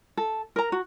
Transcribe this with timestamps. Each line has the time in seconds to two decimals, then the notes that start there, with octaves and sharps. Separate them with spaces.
0.17 A4
0.56 A#4 A#5
0.72 F#4